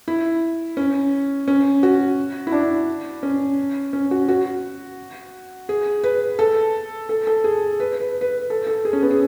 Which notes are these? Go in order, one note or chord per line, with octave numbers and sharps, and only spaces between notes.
E4
C#4
C#4
F#4
E4
D4
C#4
C#4
F#4
F#4
G#4
B4
A4
A4
A4
G#4
B4
B4
B4
A4
A4
G#4
C#4
B3
G#4